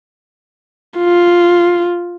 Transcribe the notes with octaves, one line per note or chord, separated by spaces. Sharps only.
F4